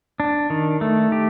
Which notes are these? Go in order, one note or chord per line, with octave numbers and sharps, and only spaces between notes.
D4
D#3
A3
G4